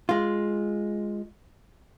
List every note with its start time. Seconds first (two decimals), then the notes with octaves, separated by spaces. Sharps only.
0.09 G#3 F4